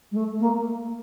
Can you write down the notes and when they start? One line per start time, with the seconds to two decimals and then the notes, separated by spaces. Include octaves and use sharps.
0.11 G#3
0.16 A3
0.40 A#3